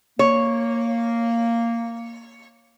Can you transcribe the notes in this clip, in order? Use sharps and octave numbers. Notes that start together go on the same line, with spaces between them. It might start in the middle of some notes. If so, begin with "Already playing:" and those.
A#3 C#5